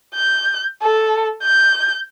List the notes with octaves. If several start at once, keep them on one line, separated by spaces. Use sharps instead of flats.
G6
A4
G6